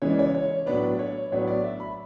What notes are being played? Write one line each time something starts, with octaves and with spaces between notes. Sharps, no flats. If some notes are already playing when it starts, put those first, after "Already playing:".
C#3 E3 G#3 C#5
D5
C#5
C#5
A2 F#3 B3 D4 B4
C#5
A2 F#3 B3 D4 C#5
D5
E5
B5